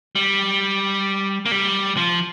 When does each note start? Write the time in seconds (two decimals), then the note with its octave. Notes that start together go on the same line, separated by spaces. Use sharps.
0.15 G3
1.46 A#3
1.52 G3
1.97 F3